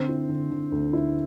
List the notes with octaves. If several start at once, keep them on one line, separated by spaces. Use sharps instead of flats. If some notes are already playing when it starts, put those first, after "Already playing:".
Already playing: D3 C4 C5
E4
D3
D3
D2
E4